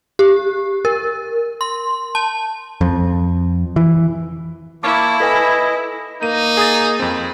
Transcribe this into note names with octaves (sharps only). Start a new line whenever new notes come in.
G4
A#4
C6
A5
F2
E3
A#3 E4 A5 C#6 D6 F6 G#6
A4 B4 D#5 G#5
A#3 D#4 D#7
G#4 D#6 A6
F2 C4